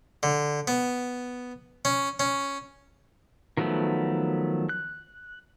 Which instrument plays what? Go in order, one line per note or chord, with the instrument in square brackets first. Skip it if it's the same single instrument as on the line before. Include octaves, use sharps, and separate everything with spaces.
[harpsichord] D3
B3
C#4
C#4
[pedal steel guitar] D#3 F3 F#3 A3 B3
F#6